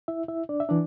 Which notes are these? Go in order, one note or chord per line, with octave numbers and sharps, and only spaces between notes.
E4 E5
E4 E5
D4 D5
E5
E3 D4 D5